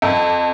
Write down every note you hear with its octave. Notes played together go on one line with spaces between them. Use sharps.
F2